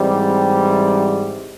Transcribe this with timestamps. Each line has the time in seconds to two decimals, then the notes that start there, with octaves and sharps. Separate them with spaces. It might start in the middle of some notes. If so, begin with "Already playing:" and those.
Already playing: G#2 E3 G3 C4